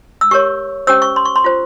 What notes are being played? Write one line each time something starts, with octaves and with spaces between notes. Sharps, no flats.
E6
G4 A#4 C#5 C#6
C#4 G4 C5 E6
C#6
C6
C#6
C6
F4 C5